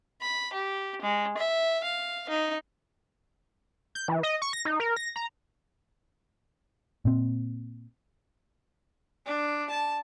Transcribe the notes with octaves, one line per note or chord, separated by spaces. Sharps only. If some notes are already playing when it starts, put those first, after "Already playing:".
B5
G4
G#3
E5
F5
D#4
G6
E3
D#5
C#6
A#6
D#4
A#4
A#6
A#5
A#2 C4
D4
A5